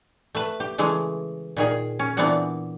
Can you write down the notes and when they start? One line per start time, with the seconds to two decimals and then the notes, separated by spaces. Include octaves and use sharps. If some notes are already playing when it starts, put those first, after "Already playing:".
0.35 A3 B4
0.60 G4
0.78 C#3 E3 G#3 A3
1.57 A#2 D#3 G#4
1.99 C#4
2.17 A#2 E3 B3 C4 D4 F#5